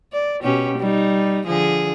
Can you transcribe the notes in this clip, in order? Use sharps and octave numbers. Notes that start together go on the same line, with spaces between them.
D5
B2 C#4 G4
G3 D#4
D3 F3 G#4